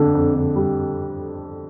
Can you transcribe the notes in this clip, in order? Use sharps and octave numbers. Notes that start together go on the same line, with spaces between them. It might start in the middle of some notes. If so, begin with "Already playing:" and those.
Already playing: F2 D3 D4
F2
D3
G3